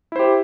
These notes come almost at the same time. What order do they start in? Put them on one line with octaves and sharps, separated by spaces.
E4 C5 G4